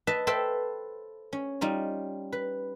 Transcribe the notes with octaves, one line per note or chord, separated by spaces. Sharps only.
B4 D#5 E5 A5
A4 B4 C5 E5 G5
C#4
G3 D#4 F4
B4